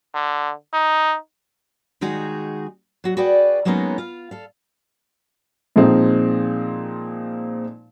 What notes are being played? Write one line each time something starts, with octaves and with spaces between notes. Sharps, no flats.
D3
D#4
D#3 G#3 D#4 F#4 G#4
F#3 F#4
F#4 G#4 B4 D5 G5
F#3 G#3 A#3 B3 C#4 D#4
F4 F5
A4 F5
A#2 F3 G#3 C4 D#4